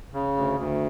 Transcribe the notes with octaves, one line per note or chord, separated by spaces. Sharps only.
C#3
D2
D2